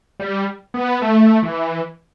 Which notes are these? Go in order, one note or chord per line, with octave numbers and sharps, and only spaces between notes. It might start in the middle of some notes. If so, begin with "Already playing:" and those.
G3
B3
A3
E3